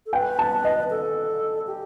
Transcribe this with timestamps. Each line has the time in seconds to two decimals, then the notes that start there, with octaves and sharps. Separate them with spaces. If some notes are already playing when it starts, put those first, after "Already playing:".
0.06 A4
0.13 B4 G5
0.39 A5
0.65 D#5
0.90 A4
1.67 G4